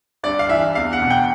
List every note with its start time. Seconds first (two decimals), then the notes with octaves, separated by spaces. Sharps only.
0.23 G2 D5
0.39 F5
0.49 E3 E5
0.75 E2 F5
0.93 F#5
1.02 B2
1.10 G5